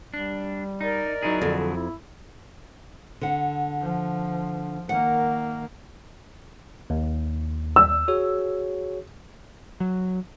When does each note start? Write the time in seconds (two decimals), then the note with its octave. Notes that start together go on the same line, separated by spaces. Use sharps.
0.14 G3 D4
0.81 D#4 A#4 D5 D#5
1.23 F#3 D#4 E4 G#4
1.42 F2 D3
1.75 E4
3.21 D3 F#5
3.82 F3
4.89 D#3 A#3 F#5
6.90 D#2
7.76 E6
8.08 F#4 G#4 C#5
9.80 F#3